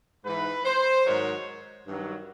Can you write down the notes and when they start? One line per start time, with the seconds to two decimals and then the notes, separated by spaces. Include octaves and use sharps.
0.25 G#2 E3 B4
0.65 C5
1.05 G#2 D#3 F#3 C#5
1.87 G2 D#3 F#3